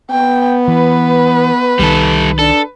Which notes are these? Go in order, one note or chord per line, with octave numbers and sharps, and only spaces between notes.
B3 G5
E3 B4
C2 D#3 G3 A4
D4 A4